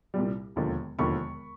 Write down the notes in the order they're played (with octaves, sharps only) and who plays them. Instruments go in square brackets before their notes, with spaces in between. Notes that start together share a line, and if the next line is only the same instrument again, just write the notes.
[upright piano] C2 A#2 G3
E1 D#2 D3 F3
E1 D#2 D3 F3 B5 C#6